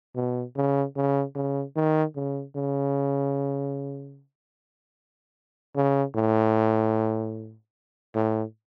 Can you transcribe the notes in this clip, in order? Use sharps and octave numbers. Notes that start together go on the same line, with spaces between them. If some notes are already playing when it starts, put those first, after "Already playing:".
B2
C#3
C#3
C#3
D#3
C#3
C#3
C#3
A2
A2